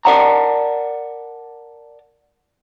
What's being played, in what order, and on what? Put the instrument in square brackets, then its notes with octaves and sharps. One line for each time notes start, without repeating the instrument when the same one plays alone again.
[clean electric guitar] A#4 D5 F#5 A5 A#5